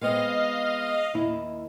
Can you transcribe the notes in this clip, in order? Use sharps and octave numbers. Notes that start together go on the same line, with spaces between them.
G#3 B3 C4 D#5 F5
D#2 E4